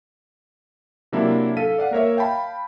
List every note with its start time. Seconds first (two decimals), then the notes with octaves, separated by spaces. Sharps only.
1.12 C3 F#3 A#3 D4 E4
1.57 A4 F5 B6 D#7
1.78 D5 F5 F#5
1.91 A#3 A#4 C#5 E5
2.17 F5 G5 A5 B5